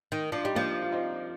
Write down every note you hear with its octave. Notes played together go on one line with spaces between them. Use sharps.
D#3
F3 D4
G3 D#4
F3 A#3 D4
F4
C4 D#4